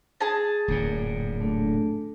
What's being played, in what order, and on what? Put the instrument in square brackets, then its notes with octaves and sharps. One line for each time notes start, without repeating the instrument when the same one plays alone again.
[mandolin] G#4 A5
[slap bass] D1 F#2 A#2
[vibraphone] A3 D4 A4